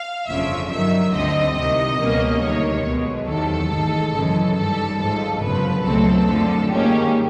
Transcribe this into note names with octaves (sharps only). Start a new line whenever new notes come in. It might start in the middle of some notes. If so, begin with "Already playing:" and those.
Already playing: F5
G1 F2 C#3 F3 E5
G2 D#3 F#3 E5
D2 D3 G3 C4 D#5
C2 C3 D#3 D#5
C#2 B2 G3 A#3 C#4
D2 C3 D#3 C#5
B1 B2 G#3
E2 C3 D#3 F#3 A4
A1 G#2 D#3 G#3
F#2 C#3 E3 G#3
G#1 G2 D#3 G3 A4
G#1 G#2 F3 G#3 A4
G1 F#2 C#3 F3 B4
C#2 B2 F#3 A3 C4 A4
F#2 D3 F3 A3
G#2 D#3 G3 A#3 C#4 G4